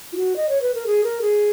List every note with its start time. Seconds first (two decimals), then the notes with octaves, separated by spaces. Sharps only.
0.12 F4
0.17 F#4
0.36 D#5
0.49 C#5
0.62 B4
0.74 A#4
0.86 G#4
1.04 A#4
1.22 G#4